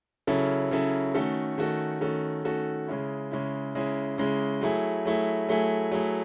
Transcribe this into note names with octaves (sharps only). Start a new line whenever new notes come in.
C#3 F#3 C#4 E4 A4
C#3 F#3 C#4 E4 A4
D#3 A3 C#4 F#4 A4
D#3 A3 C#4 F#4 A4
D#3 A3 C#4 F#4 A4
D#3 A3 C#4 F#4 A4
C#3 G#3 C#4 E4
C#3 G#3 C#4 E4
C#3 G#3 C#4 E4
C#3 G#3 C#4 E4
F#3 A3 E4 G#4
F#3 A3 E4 G#4
F#3 A3 E4 G#4
F#3 A3 E4 G#4